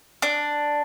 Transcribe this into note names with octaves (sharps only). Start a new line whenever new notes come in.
D4